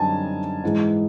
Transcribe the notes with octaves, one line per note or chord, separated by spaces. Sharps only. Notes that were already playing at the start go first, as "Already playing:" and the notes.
Already playing: F#2 D3 G3 C4 D#4 G#5 A5
G#2 E3 G#3